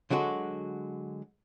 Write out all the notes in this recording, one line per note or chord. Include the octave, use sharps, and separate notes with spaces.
D3 F#3 G#3 F#4